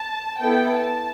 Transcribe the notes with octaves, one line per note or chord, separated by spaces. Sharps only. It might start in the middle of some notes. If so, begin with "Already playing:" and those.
Already playing: A5
B3 E4 A4 G5
A5